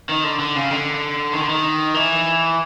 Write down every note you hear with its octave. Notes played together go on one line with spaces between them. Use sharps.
D#3
D3
D3
C#3
D3
D#3
D3
D#3
E3